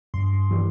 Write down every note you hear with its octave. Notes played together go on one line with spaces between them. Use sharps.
G2 C6
E3 G3